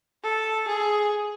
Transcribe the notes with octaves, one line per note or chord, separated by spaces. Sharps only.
A4
G#4